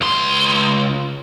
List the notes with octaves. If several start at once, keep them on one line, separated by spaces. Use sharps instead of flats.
C#2 C6